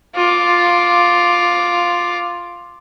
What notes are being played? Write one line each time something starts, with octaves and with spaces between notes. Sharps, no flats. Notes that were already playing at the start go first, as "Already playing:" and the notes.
F4 D6